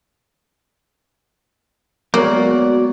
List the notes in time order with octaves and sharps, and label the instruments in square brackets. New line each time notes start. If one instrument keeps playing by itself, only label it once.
[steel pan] F#3 G#3 C#5 [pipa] A#3 [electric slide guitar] B3 D5
[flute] F#4